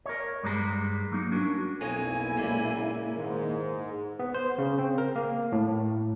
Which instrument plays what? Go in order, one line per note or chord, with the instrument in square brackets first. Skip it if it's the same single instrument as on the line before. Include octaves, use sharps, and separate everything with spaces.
[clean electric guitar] A#4 C#5
G2 G3 G#3 A#5
F#3 A#3 D#4
C#4 D4 F#4 A#4
[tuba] B1 [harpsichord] F2 D#4 [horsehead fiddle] A#3 E4 [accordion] G#5
[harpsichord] C#2 A#2
[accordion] G#2 [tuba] D#3
[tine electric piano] B3
C5
C#3
C4
A#4
A#3
A2